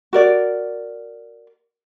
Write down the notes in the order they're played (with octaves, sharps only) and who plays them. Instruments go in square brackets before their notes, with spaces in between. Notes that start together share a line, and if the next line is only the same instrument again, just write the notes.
[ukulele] F#4 A#4 D5